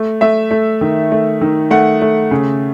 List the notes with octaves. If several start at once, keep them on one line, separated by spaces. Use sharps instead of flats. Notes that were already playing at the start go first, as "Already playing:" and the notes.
Already playing: A3
A3 E5
A3
D#3
A3
D#3
A3 F#5
A3
C#3